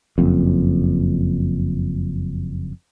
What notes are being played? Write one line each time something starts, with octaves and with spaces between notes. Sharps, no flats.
F#1 F2